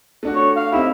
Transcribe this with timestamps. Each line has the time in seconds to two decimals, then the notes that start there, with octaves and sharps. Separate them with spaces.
0.23 A3 D4 F#4
0.35 C#5
0.56 F5
0.72 C4 D#4 E4 G4